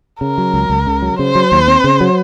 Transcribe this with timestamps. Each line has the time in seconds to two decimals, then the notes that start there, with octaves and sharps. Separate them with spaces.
0.21 C#3 A#4
0.38 F#3
0.54 C#2
0.70 C#2
0.87 C#3
1.02 F#3
1.19 C#3 C5
1.35 F#3
1.52 D#2
1.68 C4
1.84 C#3
2.01 F#3